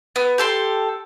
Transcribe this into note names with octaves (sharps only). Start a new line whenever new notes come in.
B3
G4 A4 C6